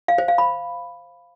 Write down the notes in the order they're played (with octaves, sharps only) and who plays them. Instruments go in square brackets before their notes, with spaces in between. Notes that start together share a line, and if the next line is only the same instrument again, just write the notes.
[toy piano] F5
C5
F5
B5